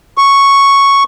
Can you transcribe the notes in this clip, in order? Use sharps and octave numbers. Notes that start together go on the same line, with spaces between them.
C#6